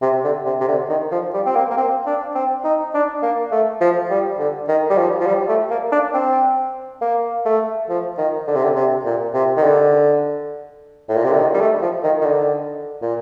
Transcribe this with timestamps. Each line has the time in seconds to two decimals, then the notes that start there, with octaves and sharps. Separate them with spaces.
0.02 C3
0.24 D3
0.46 C3
0.61 C3
0.68 D3
0.89 D#3
1.11 F3
1.34 G3
1.46 C4
1.56 A#3
1.70 A#3
1.77 C4
2.06 D4
2.35 C4
2.64 D#4
2.94 D4
3.23 A#3
3.52 A3
3.81 F3
4.10 G3
4.39 D3
4.68 D#3
4.90 G3
4.98 F3
5.20 F3
5.27 G3
5.48 A3
5.71 A#3
5.92 D4
6.14 C4
7.02 A#3
7.46 A3
7.89 F3
8.18 D#3
8.48 D3
8.56 C3
8.64 D3
8.76 C3
9.06 A#2
9.34 C3
9.57 D#3
9.64 D3
11.09 A2
11.16 A#2
11.24 C3
11.31 D3
11.39 D#3
11.54 G3
11.60 A3
11.82 F3
12.04 D#3
12.21 D#3
12.26 D3
13.02 A#2